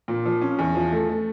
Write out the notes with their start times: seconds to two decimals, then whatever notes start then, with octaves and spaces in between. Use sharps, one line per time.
0.08 A#2
0.26 F3
0.41 C#4
0.59 E2
0.75 F3
0.92 A3
1.09 A3